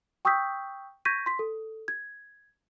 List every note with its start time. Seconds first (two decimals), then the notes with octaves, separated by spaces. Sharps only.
0.25 G5 C#6 D#6 E6 G6 B6
1.05 C#6 G6 G#6 A#6 B6 D#7
1.26 C6 B6
1.39 A4
1.88 G#6